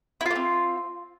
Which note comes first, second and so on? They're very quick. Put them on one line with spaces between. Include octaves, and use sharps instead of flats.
E4 F4 A#3 C4